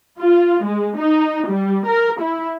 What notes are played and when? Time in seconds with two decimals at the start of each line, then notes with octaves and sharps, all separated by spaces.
0.19 F4
0.65 G#3
0.98 D#4
1.48 G3
1.87 A#4
2.22 E4